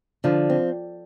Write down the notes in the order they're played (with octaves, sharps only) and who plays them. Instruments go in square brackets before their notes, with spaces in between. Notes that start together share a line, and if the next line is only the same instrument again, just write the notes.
[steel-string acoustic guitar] D3 [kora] F3
[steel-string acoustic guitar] C4